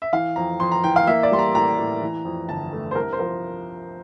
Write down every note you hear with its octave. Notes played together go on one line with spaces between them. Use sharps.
E5
E3 F5
F2 A#5
F2 C6
A#5
E3 G5
F5
A#3 E5
D5
G3 C6
A#5
A2 A#5
A2
E3
F2
G1 A5
A3
C5
C2 A#4
C5
F3 A#4